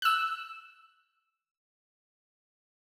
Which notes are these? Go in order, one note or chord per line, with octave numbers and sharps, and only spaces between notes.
E6 F#6